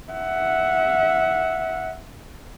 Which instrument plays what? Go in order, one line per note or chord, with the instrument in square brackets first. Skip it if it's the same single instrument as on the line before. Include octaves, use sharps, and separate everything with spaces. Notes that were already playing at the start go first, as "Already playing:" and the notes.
[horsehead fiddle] E5 F#5